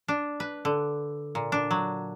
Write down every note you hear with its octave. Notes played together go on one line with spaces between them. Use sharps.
D4
B4
D3
A#2
D4
F#3